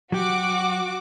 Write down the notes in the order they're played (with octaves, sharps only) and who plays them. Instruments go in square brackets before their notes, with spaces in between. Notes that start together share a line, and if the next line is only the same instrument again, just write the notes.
[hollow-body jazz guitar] F#3 G4 [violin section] F#4 D6